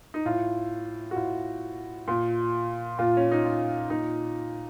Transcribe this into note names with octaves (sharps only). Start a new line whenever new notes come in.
D#4
A2 F4
F#4
A2 F4
A#2
A#2 F4
C#4
D#4
F4
A#2 D#4